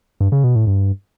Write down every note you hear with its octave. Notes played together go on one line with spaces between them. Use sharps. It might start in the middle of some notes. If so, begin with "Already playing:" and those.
G2
C#3
B2
A2
G2